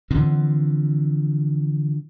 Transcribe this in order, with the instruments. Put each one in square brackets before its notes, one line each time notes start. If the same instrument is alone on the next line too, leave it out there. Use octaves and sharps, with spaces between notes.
[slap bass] D3 E3 F3 C4